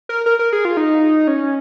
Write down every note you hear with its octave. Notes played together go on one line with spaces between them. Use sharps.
A#4
A#4
A#4
G#4
F4
D#4
C#4